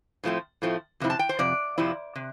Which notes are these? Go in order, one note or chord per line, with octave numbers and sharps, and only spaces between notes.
A2 F3 A3 C4
A2 F3 A3 C4
F2 C3 C4 E4
A5
G5
C5
F2 C3 D5
F2 C3 F3 C4 E4
C3